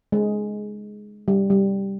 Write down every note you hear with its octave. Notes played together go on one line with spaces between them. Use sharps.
G#3
G3
G3